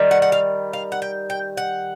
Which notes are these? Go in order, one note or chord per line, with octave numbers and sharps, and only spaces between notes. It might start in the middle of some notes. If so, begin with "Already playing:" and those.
Already playing: D#3 G3
F#5
F#5
F5
F5
F#5
G5
G5
F#5